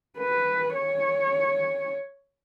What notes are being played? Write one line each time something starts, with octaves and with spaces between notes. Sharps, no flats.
B4
C#5